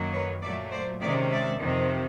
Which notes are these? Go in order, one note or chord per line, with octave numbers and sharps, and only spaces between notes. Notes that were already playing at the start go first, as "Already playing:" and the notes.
Already playing: F#2 D#3 F#3 A#3
B4 C#5
A#2 F#3 A3 D5 E5
C5 D5
C3 D#3 G#3 C#4 D5 E5
D5 E5
F2 C3 D#3